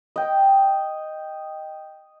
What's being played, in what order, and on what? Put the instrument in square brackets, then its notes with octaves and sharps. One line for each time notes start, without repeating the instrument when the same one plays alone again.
[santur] D#5 G5